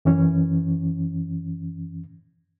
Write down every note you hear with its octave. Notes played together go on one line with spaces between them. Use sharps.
F#2 E3 C#4